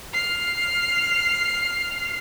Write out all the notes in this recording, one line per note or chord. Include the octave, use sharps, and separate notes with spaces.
F6 C7